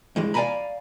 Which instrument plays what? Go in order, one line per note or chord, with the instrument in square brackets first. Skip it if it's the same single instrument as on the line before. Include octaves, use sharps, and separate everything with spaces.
[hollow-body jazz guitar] G2 E3 G#3
D5 F5 G5 G#5 A#5 B5